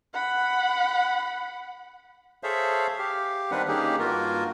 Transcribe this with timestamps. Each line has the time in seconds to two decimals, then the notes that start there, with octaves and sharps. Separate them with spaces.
0.14 F#5 B5
2.43 G#4 A4 C5 C#5 E5 F5
2.99 G4 F5
3.51 D#3 G3 C4 D4 B4 F#5
3.68 D#3 A#3 C#4 D#4 G4 G#4
3.99 G2 A#3 F4 F#4 A#4